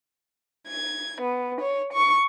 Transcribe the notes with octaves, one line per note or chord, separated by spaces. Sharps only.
G#6
B3
C#5
C#6